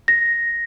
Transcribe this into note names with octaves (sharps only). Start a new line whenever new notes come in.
A#6